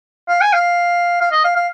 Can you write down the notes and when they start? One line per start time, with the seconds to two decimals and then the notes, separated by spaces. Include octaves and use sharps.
0.28 F5
0.41 G#5
0.53 F5
1.21 F5
1.32 D#5
1.44 F5
1.56 F5